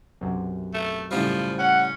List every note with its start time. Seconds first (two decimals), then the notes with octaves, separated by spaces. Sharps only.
0.21 B1 F#2 C3
0.74 A3
1.11 A2 C#3 F3 G3
1.59 C#4 F#5